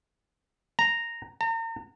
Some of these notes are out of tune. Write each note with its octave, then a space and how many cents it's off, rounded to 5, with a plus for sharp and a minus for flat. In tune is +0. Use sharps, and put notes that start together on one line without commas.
A#5 -5
A#5 -40